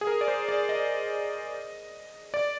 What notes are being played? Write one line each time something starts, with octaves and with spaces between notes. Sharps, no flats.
G#4
A#4
D5
C5
D5
D#5
D5